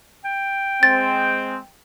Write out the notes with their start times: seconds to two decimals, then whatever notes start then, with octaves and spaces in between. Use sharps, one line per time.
0.25 G5
0.83 G#3 C4 A6